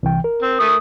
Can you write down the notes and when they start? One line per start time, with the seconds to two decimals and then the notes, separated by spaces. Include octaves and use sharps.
0.03 C2 E3 G5
0.24 A#4
0.42 C4
0.59 A3 D#6